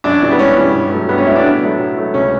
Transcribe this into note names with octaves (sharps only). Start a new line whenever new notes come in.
F#2 D4
E3 G3 D4
B3
F#2 C#4
E3 G3
G2
F#3 A3
G2 B3
C#4
F#3 A3 E4
D4
A2 B3
F#3 A3
A2
F#3 A3
C#2 C#4